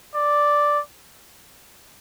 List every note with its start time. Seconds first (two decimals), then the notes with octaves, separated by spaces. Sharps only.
0.15 D5